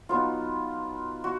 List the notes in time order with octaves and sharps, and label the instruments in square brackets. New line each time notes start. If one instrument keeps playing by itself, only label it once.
[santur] F#3 B3 D#4 F4
F#4